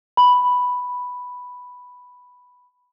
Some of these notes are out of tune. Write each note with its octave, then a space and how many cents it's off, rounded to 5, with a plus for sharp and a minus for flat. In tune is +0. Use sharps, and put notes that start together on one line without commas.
B5 +0